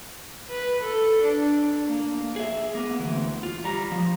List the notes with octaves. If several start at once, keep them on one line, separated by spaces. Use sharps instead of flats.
B4
A4
D4
A#3
G#4 E5
A#3 B3
D2 E3
F4
G3 A#5
F3